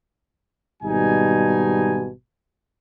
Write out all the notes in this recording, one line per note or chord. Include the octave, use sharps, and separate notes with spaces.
G#1 B2 G3 D#4 G#5